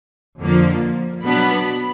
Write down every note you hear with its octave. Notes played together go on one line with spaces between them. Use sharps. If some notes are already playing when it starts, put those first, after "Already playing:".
F2 D3 F3 A#3
B2 F#3 B3 D4 B5